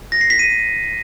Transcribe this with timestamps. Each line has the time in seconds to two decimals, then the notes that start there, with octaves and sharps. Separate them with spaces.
0.12 A#6
0.21 C7
0.30 B6
0.39 D#7